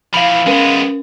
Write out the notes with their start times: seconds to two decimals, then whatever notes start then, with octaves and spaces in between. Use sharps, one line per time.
0.14 E3 F3 F5 B5 D7
0.46 G#3 B3 C#4 A#4 B4